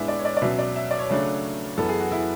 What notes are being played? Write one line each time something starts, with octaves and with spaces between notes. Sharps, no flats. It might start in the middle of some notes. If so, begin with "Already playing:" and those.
Already playing: A2 G#3 B3 D4 E5
D5
C#5
D5
D5
B2 F#3 C#4 E5
D5
E5
D5
C#5
C#3 F#3 A3 D4
F#2 E3 B3 A4
G#4
F#4
E4